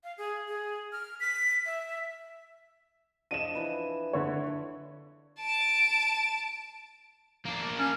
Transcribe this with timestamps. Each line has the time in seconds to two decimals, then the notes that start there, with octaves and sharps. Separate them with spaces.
0.04 F5
0.18 G#4
0.48 G#4
0.93 F6
1.20 B6
1.66 E5
3.31 F3 D4 D#5 D#7 E7
3.55 E3 B4
4.13 D3 C#5
5.40 A5 D7
7.46 A#3 D4
7.79 C#4